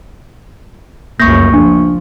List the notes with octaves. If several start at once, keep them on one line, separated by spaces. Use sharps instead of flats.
F1 C#2 F#2 A#3 C#6 G6 A#6
F3 D4